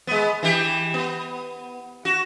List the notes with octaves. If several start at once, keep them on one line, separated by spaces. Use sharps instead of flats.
G#3 B3
E3 G4
B3
F#4